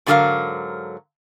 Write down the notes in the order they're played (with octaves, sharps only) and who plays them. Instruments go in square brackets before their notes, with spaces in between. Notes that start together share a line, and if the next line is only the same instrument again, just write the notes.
[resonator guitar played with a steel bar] G#2 D3 F#3 A3 A#4 F5